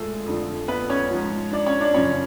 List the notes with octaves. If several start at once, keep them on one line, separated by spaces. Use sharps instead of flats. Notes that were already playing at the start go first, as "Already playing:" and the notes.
Already playing: F2 D3 F3 G#3 A3 G#4 A4
F2 D3 F3
B3 B4
C#4 C#5
G#2 F3
D4 D5
C#4 C#5
D4 D5
F#2 C#3 F3 C#4 C#5